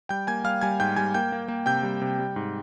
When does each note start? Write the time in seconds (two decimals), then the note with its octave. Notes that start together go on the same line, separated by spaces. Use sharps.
0.09 G3 G5 G6
0.27 A#3 G#5 G#6
0.44 G3 F5 F6
0.61 G3 G#5 G#6
0.80 G#2 G5 G6
0.96 G3 G#5 G#6
1.14 A#3 G5 G6
1.32 A#3
1.48 A#3
1.66 C3 G5 G6
1.83 G3
2.02 C3
2.19 G3
2.36 G#2